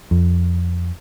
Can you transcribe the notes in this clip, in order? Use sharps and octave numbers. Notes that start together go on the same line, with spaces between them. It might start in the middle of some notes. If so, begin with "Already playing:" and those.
F2